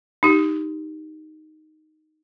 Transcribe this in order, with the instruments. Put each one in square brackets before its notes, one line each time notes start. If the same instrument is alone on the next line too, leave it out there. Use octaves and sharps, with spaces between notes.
[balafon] D#4 G4